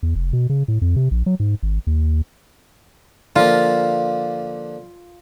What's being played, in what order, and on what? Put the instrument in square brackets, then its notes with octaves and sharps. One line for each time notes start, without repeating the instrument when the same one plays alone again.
[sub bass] E2
F1
B2
C#3
A2
F2
C3
A#1
F#3
G#2
G#1
D#2
[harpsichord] D3 F3 A#3 [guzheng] F4